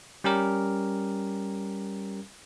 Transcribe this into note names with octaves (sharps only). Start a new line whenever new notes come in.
G3 C#4 G4 A#4